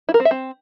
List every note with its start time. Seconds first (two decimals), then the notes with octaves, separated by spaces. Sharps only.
0.09 E4
0.14 A#4
0.20 C4
0.25 E5
0.31 C4